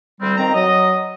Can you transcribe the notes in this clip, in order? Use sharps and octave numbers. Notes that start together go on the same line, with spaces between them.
D2 G3 C4
F2 D#3 C4 A#5
F#3 D#5